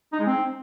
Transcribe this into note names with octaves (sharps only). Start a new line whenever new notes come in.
D#4
G#3
C4